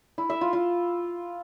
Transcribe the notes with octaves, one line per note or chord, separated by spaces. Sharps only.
E4
E5
F4
F4